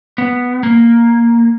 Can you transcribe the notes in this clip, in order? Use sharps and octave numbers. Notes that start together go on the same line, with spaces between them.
B3
A#3